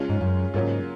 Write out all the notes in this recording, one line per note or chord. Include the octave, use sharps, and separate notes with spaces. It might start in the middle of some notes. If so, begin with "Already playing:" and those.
Already playing: C#3 G#3 C#4 F4
G#2
F#2
G#2 C#3 F#3 A#3 F4